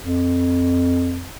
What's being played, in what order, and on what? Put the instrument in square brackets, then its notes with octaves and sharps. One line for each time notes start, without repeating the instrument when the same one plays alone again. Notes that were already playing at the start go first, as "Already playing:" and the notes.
[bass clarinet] F2